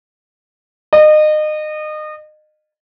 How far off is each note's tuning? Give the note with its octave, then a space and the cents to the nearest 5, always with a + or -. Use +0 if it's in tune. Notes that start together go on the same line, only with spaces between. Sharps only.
D#5 -30